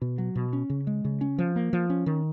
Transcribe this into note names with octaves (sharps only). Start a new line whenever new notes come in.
B2
F#3
B2
C#4
C#3
G#3
C#3
C#4
F3
A#3
F3
C#4
D#3